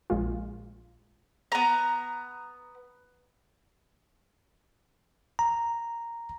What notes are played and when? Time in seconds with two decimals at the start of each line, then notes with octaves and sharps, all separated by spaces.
0.10 A#1 G#3 F4
1.52 B3 A#5
5.39 A#5